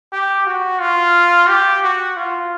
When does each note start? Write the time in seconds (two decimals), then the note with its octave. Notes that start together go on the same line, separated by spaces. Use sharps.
0.13 G4
0.46 F#4
0.81 F4
1.49 G4
1.83 F#4
2.17 F4